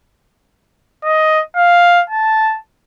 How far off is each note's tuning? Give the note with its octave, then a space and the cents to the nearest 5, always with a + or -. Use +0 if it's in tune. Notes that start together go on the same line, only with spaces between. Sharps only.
D#5 +10
F5 +5
A5 -5